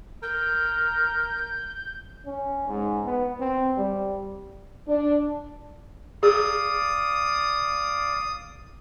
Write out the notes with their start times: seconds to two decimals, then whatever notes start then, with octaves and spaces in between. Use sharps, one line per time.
0.23 A#4 G6
2.25 C#4
2.68 G#2
3.04 B3
3.40 C4
3.77 G3
4.87 D4
6.23 G#4 D5 F5 D#6